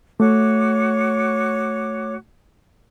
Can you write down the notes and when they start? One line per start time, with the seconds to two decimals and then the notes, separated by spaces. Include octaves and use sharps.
0.20 A3 F#4 C#5 D6